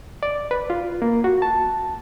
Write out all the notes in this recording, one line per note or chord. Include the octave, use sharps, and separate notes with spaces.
D5
B4
F4
A#3
F#4
A5